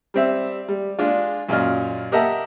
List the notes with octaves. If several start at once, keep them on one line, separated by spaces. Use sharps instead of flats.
G3 C4 E5
G3
G#3 D4 F4
F#2 A#2 F4 D#5 F6
G4 A#4 D#5 E5 F#5 A5